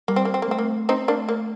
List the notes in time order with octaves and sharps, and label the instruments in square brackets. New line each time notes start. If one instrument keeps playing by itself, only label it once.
[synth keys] G3 [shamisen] A#3
[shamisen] C4
A#3
C4
A#3
[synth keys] A3 [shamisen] C4
[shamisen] A#3
C4 D#4
A#3 D4
A#3